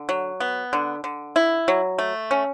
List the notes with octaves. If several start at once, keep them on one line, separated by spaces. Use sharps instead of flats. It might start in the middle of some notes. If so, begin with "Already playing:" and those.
Already playing: D3
F#3
B3
D3
D3
E4
F#3
A3
C#4